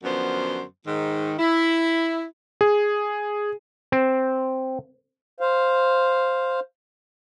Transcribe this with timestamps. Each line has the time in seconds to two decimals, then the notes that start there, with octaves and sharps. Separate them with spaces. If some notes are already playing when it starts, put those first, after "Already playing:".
0.03 F#2 D3 F3 B3 C5
0.87 G#2 D#3
1.38 E4
2.61 G#4
3.92 C4
5.40 C5 F5